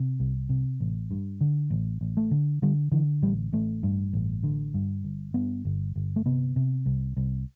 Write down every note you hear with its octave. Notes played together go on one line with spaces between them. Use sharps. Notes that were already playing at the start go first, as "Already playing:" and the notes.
Already playing: C3
C2
C3
A1
G2
D3
A1
A1
A3
D3
D3 G3
D3 E3
A1 G3
A1 A3
G2
A1
D3
G2
G1
G2 B3
G1
G1
A3
C3 B3
C3
C2
C2